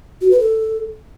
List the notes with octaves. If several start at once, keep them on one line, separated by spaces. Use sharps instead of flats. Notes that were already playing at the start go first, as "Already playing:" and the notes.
F#4
B4
A4